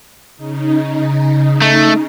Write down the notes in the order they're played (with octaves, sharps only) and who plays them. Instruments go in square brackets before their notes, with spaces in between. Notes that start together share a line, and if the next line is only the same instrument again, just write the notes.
[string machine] C#3 D#4
[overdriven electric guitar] A3